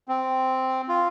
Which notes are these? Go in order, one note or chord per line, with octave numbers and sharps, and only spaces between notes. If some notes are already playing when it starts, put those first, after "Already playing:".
C4
F4